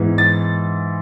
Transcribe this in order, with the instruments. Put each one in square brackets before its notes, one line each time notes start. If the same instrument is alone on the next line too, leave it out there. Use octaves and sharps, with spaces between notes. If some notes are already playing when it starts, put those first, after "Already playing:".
Already playing: [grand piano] G#2 E3 G#3 B3
A6